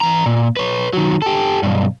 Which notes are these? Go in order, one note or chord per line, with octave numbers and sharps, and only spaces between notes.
E3 A#5
A#2
B4 C#5
D#3 F#3
G4 A4
B1 G2